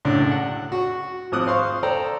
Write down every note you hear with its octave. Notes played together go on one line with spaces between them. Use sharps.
C#2 F#2 A2 D4
F#5
F#4
G#1 F3 D6 D#6 F#6
C5 F5 C6 C#6
A4 C5 D5 G5 A#5